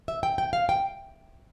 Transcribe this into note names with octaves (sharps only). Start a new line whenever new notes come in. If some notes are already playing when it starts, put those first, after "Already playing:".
E5
G5
G5
F5
G5